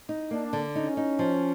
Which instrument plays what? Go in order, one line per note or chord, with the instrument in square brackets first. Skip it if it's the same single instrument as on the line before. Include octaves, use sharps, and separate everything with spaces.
[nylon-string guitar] D#4
[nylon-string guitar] A#3 [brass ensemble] D4
[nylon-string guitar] D3
[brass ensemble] C#4 [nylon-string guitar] D#4
[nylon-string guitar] D#4
F3